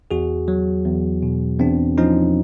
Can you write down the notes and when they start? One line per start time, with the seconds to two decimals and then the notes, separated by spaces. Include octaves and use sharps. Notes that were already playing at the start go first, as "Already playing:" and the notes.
0.11 E2 F#4 G#4
0.48 F#3
0.85 E2
1.23 B2
1.60 E2 C4 D4
1.98 F3 C#4 D#4